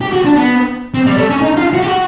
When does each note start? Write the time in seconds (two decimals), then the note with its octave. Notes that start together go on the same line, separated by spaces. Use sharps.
0.01 G4
0.13 F#4
0.25 D4
0.37 B3
0.94 C4
1.07 G3
1.18 A3
1.30 C#4
1.41 D#4
1.57 F4
1.74 F#4
1.82 G4
1.88 F#4